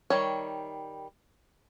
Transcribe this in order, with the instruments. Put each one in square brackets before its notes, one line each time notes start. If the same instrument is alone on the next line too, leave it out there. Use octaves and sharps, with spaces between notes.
[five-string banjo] D#3 G3 C#5